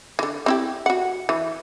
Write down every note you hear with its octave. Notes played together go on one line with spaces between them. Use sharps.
D3 E3
C4 E4 G4
F#4 F#5
E3